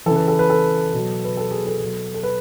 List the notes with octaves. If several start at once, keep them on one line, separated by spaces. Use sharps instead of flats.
C#3 E3 A4
B4
A4
B4
A4
B2 F#3
B4
A4
G#4
A4
B2 F#3
A4
B4